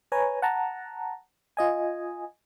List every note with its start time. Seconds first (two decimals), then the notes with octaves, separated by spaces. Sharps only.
0.12 B4 C#5 G#5 A#5
0.42 F#5 A5 A#5
1.57 F4 D#5 G#5